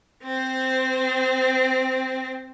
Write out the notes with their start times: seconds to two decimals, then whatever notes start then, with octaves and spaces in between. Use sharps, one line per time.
0.24 C4 C5